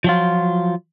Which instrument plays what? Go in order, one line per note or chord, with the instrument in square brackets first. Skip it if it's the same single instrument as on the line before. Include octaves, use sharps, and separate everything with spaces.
[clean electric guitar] F3 F#3 F4